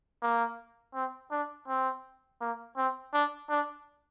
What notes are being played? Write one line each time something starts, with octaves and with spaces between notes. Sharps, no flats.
A#3
C4
D4
C4
A#3
C4
D4
D4